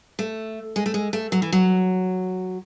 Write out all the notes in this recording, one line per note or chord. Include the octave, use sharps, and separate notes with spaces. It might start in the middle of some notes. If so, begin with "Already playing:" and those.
A3
G#3
A3
G#3
A3
F#3
E3
F#3